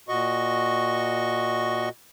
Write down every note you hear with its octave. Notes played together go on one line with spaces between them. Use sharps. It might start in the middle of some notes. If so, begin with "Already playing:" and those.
A#2 F#4 D#5 C#6